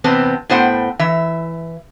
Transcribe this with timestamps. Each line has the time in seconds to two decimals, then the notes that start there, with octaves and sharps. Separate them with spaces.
0.04 E2 C3 B3 C4 A5
0.50 A2 B3 C5 F#5 G5
0.99 E3 E5